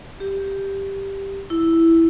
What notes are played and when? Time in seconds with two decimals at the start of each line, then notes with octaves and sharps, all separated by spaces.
0.20 G4
1.50 E4